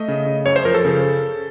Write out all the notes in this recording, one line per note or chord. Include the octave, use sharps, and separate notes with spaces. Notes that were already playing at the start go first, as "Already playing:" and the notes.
Already playing: A3 D#5
C#3
C#3
F#2 C#5
C5
F3 A#4
A4
C#3